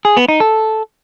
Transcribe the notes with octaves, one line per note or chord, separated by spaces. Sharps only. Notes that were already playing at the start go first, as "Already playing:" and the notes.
G#4
B3
D#4
A4